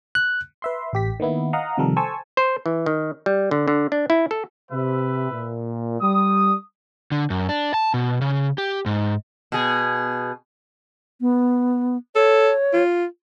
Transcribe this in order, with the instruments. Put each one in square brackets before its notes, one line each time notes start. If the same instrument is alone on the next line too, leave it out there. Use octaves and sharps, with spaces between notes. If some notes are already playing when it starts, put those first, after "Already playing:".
[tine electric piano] F#6
[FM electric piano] B4 E5 C6
A1 G4 B6
D#3 A#3 B3 E4
D#5 F5 F#5 A#5
C3 D#3 F3 G3 A4 A#4
A4 C5 G#5 A5 C#6 E6
[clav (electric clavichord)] C5
E3
D#3
G3
D3
D3
D4
E4
A4
[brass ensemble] C3 [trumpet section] B4 E5
[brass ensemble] A#2
[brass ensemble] G3 [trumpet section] D#6
[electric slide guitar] D3
F#2
D4
A5
B2
C#3
G4
G#2
[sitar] B2 G#4
[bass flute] B3
[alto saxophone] A4 [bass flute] C#5
[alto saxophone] F4